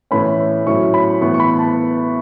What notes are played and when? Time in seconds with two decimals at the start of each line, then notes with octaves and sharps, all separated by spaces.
0.11 A2 E3 A3 C#4 B5
0.66 A2 F#3 C#4 C#6
0.94 B5
1.21 A2 E3 B3 C#6
1.34 C#6
1.40 B5
1.59 A5